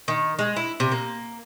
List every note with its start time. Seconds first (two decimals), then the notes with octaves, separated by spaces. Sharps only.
0.08 D#3
0.39 G#3
0.56 E4
0.80 C3
0.92 A#3